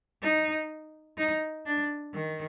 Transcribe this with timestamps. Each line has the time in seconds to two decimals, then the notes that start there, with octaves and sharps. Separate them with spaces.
0.22 D#4
1.18 D#4
1.66 D4
2.14 D#3